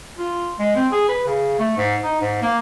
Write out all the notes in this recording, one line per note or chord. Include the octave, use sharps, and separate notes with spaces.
F4
G#3
C4
G#4
B4
C#3
A3
G#2
D#4
G#2
A#3